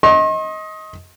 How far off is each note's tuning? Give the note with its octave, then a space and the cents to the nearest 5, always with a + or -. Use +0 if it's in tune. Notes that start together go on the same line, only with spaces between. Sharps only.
D#5 +20 C6 +45